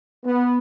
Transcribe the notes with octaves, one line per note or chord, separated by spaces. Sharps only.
B3